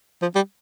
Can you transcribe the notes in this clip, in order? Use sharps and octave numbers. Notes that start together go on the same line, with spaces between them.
F3
G3